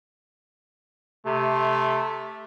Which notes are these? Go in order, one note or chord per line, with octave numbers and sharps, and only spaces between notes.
C3 A3